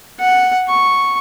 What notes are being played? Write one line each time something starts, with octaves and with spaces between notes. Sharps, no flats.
F#5
C#6